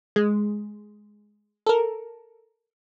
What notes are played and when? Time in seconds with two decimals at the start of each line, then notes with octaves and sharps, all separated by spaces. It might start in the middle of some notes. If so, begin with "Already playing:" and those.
0.16 G#3
1.67 A4 A#4